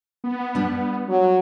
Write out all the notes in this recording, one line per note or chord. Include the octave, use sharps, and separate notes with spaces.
B3
G3 D4
F#3